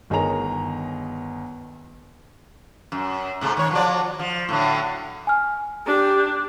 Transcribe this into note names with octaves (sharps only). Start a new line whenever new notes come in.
G1 D#3 G#4 C#5 A#5 F7
F#2
G#2 C3 A3
D#3 C#5
F3 F#3 D5
F3
A2 D3 F#3
G#5 F6
D4 G4